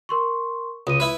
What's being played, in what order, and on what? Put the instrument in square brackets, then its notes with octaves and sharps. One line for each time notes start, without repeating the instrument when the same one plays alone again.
[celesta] A#4 C6 C#6
[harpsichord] C#2 [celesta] D#6 D#7
[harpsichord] E4 B4